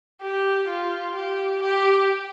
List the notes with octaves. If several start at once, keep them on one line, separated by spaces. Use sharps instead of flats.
G4
F4
G4
G4